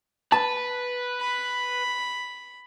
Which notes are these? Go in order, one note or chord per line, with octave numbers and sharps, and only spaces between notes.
B4 A5
B5